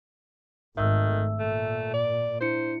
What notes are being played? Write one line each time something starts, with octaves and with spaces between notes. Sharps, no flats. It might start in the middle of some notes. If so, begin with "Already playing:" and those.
G#1 D#3 A3 E5 E6
A#2 A3
D5
D4 E4 C5 C#7